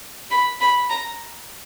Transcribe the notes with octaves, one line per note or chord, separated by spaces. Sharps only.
B5
B5
A#5